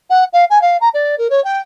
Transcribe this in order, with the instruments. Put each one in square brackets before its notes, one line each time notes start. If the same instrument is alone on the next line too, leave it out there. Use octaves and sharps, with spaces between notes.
[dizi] F#5
F5
G#5
F5
A#5
D5
A#4
C#5
G5